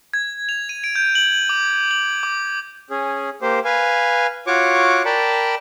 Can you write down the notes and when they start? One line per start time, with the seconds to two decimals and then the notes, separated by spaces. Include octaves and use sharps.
0.14 G#6
0.49 F7
0.69 D#7
0.84 D7
0.96 G6
1.15 F#7
1.49 D6
1.91 F#7
2.23 D6
2.90 C#4 G#4
3.42 A#3 G4 C5
3.65 B4 F5 G#5
4.47 F4 F#4 C#5 C#6 D6
5.05 A#4 D5 G5 A5 B5